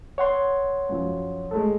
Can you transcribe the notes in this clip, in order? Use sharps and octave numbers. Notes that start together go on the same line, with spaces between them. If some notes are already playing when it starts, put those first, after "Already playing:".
C#5 F#5 C6
F#2 F3
G#3 A3 A4